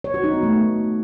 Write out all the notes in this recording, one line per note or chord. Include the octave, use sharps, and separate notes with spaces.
C#5
F#4
D#4
B3
A3